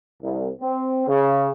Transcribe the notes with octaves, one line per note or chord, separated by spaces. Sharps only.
C2
C4
C#3